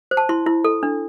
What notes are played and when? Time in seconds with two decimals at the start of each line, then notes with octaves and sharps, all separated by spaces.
0.11 C5
0.17 A5
0.29 E4 C6
0.46 E4
0.64 A4
0.83 D4